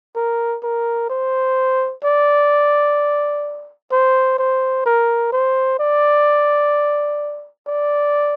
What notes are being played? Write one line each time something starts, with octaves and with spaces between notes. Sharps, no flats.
A#4
A#4
C5
D5
C5
C5
A#4
C5
D5
D5